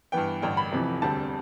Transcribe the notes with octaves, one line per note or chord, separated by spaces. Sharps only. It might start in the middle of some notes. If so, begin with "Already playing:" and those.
G2 E3 B3 G5
A1 G2 D3 G5
B5
F1 F2 C3 E3
E1 D2 D3 G3 C4 A5